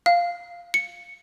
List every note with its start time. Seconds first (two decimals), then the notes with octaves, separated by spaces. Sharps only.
0.06 F5
0.74 C#7